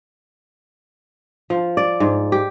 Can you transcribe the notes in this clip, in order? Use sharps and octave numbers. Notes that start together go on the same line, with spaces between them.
F3
D5
G#2
G4